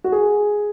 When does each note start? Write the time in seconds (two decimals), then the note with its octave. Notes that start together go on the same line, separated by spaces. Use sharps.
0.04 F#4
0.12 G#4